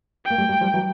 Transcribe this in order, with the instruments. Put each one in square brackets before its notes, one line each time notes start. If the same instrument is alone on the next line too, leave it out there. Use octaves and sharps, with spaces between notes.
[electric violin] G5
[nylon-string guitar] A#3
G3 A3
G3 A3
F3 G3
E3 F#3